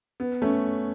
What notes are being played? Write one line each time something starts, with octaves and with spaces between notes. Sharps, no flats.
B3
A3 C#4